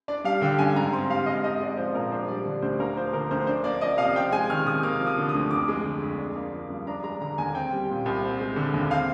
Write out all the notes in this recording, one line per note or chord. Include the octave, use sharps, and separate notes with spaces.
D4 D5
G3 F5
D3 G5
G2 G#5
G#2 A#5
C4 C6
G3 F5
G#2 D#5
C4 D#5
G#3 D5
F3 C5
A#2 A#4
D4 C5
G3 D5
D3
D2 C5
A#3 A#4
F3 C5
D3 A#4
D2 C5
D4 C5
A#3 D5
F3 D#5
C3 F5
C4 G5
G#3 G#5
D#3 F6
C3 D#6
A#3 F6
F3
D#6
D3
D#6
D2
F2 D6
G#3
D3
F2
D4
A#3
F3
G2
D4 A#5
G#3 A#5
D3 A#5
D#2 G#5
C4 G5
G3
A#2
C2
C4
G#3
D3
D#2
C4 F5